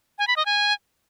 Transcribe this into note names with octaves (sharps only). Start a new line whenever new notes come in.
G#5
B5
D#5
G#5